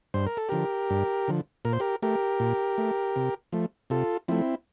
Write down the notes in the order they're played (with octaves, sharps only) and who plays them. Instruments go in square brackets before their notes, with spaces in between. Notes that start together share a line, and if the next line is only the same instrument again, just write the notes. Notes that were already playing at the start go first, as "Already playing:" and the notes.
[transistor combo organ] G2 C5
A#4
A4
D3 F3 G4 A#4
G2
D3 F3
A#2 A#4
C5
G4 A#4
A3 G4 A#4
A#2
A3
C3
F3 A3
C3 F4 A4
F3 A3 C4 E4